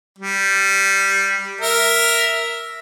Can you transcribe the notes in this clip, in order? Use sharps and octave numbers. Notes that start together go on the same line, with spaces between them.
G3
A#4 E5